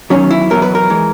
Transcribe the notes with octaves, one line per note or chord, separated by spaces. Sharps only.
E2 D#3 F#3 C#4
E4
E2 B2 F#3 A#4
B4
A#4
E3 G#3